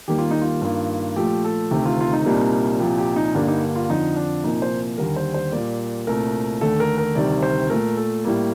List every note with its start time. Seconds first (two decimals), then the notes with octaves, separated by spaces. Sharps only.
0.08 D#2 D#3 G3 A#3 G4
0.18 F4
0.31 D#4
0.42 F4
0.62 G2 D#3 A#3
1.16 A#2 F3 A3 G4
1.44 A4
1.71 D2 C3 D#3 A3 G4
1.86 F4
2.01 F4
2.13 D#4
2.26 C2 A#2 G3 A#3
2.80 C2 A#2 F3 G4
2.98 G4
3.16 D#4
3.35 G2 D3 G3 A#3 D4
3.48 D#4
3.76 F4
3.89 F2 D3 F3 D#4
4.16 D4
4.43 C2 A#2 F3 A#3 D#4
4.62 C5
4.98 D#2 D3 G3 A#4
5.16 C5
5.34 C5
5.52 A#2 G3 A#3 D5
6.07 C2 A#2 A3 A#4
6.61 D#2 D3 A3 A4
6.80 A#4
6.98 A#4
7.15 D2 C3 D#3 G3 D5
7.43 C5
7.70 A#2 A3 A#4
7.97 A4
8.25 A2 G3 A#3